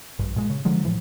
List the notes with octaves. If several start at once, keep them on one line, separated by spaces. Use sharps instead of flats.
A#1 G2
A#2 G#3
C#3
D3 F3 F#3 G#3
A2 C#3 E3 F3